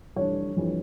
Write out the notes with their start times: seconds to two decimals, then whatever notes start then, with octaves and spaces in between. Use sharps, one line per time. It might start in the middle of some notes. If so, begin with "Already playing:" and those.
0.16 F1 F2 E3 G3 D4 C#5
0.56 F1 F2 E3 G3 D4